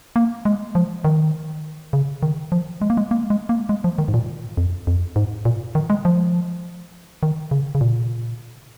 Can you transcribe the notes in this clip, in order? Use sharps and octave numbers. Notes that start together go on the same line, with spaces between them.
A#3
G#3
F3
D#3
C#3
D#3
F3
G#3
A#3
G#3
A#3
G#3
A#3
G#3
F3
D#3
G#2
A#2
F2
F2
G#2
A#2
D#3
G#3
F3
D#3
C#3
C#3
A#2